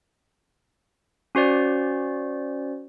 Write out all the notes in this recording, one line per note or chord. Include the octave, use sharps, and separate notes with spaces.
C#4 F#4 C5 D5